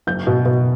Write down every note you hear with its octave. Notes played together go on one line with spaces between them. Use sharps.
F#1 G6
B2
B2